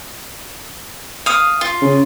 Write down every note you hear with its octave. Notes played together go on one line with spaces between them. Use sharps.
F5 D#6
F4
C#3